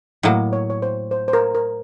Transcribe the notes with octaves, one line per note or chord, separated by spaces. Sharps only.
A2 F#3 A#3 D#5
C#5
C#5
C5
C5
C5
A#4
A#4